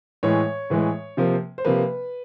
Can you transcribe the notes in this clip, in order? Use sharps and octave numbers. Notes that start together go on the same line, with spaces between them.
A2 E3 G#3 C#5
A2 E3 G#3
C3 F3 A#3
C5
C3 F3 A#3 B4